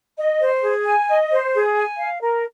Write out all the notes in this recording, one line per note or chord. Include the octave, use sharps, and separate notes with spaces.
D#5
C5
G#4
G#5
D#5
C5
G#4
G#5
F5
A#4